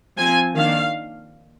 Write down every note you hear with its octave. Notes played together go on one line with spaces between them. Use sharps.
F3 C4 G#5
D#3 A#3 D4 F5